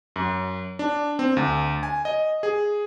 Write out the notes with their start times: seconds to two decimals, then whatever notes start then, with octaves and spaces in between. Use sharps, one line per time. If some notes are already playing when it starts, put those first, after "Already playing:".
0.16 F#2
0.79 D4
1.19 C4
1.37 D2
1.83 G#5
2.05 D#5
2.43 G#4